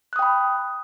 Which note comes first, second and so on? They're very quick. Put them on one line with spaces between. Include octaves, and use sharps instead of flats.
F#6 D#6 G5 B5